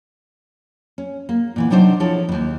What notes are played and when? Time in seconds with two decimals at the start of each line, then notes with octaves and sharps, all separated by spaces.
0.98 C#4
1.29 A#3
1.56 A#2 E3 B3
1.70 C3 F#3 D4 D#4 C5
2.00 F3 E4 A4 C#5
2.29 D#2 B2